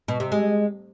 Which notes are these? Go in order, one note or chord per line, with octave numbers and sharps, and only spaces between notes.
B2
C3
G#3